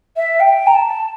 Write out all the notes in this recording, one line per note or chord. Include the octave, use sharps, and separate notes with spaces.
E5
G5
A#5
A5